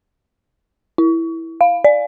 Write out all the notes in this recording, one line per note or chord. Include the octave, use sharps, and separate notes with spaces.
E4
F5
D5